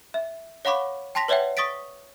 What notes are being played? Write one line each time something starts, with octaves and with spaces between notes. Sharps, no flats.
E5
C#5 F5 F#5 B5 C#6 D6
G5 A5 C6 A#6 B6 F7
B4 C#5 D5 E5 F#5 G5
C#6 D#6 A6 B6 D7